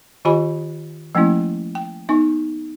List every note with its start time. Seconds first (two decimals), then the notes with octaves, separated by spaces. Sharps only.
0.25 D#3 F4 G4 D#5 G#5 B5
1.15 F3 A3 A#3 C#4 E4
1.75 G5
2.09 B3 D#4 C#6